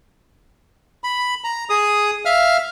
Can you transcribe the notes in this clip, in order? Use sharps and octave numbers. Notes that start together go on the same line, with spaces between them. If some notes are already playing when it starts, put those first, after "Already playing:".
B5
A#5
G#4 D#6
E5 F5 F6